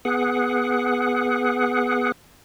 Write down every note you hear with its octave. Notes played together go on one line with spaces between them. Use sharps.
B3 G#4 F#5